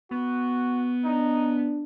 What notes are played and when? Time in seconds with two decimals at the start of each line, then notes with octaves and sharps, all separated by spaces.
0.11 B3 F#4
1.04 D4 D#4